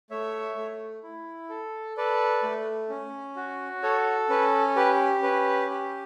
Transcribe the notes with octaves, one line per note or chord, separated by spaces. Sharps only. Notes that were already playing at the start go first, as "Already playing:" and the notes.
A3 C#5 E5
A3
E4
A4
A4 B4 D5
A3
C#4
F#4
A4 C#5
C#4 B4
G4 B4
C#4 B4
G4